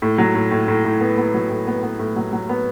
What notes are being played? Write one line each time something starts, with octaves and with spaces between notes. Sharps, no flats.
A2
F#3
A2
A2
A2
A2
B3
B3
F#3
A2
B3
B3
A2
F#3
F#3
B3